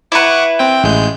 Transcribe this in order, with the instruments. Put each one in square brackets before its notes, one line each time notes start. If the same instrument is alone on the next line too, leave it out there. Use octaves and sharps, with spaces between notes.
[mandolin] E4 B4 [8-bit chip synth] F#5 C#6 D6
[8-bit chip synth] C4 G5
A1 G#3 G6